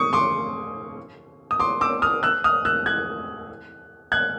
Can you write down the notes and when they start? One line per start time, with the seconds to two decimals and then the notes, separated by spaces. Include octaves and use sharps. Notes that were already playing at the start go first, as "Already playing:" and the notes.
Already playing: C#6 D#6
0.13 C6 D6
1.51 D#6
1.60 C6 D6
1.81 D6 E6
2.02 D#6 F6
2.23 E6 F#6
2.44 D#6 F6
2.65 E6 F#6
2.86 F#6 G#6
4.12 F#6 G#6